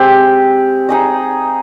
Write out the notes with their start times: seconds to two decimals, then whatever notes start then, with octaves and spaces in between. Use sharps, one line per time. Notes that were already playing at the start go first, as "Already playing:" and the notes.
Already playing: G#3 C4 G4
0.89 D#4 G#4 D#5